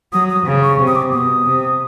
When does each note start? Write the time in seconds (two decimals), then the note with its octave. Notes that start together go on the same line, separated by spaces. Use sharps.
0.13 F#3 D#6
0.29 D#6
0.46 C#3
0.63 C#6
0.79 C3
0.87 D#6
0.95 D6
1.12 B2 D#6
1.45 C3